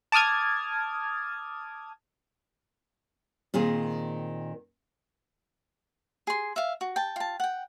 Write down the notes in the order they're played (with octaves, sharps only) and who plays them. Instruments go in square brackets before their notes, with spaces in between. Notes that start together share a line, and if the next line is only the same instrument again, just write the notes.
[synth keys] A5 D6 D#6 F6 G#6
[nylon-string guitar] A#2 D#3 C4 G#4
[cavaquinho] G#4 C6
E5 F5
F#4
G5 A5
F4 A5
F#5 G5